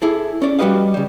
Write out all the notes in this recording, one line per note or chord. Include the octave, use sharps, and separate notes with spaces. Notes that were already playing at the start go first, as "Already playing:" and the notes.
E4 G#4 A4
C#4 D5
G3 F#4 G4 B4 D#5 F5
C#3 G3